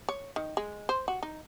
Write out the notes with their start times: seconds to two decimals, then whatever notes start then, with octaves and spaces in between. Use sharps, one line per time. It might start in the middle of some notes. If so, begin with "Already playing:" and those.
0.09 C#5
0.36 D#3
0.57 G#3
0.89 C5
1.08 F#4
1.23 D#4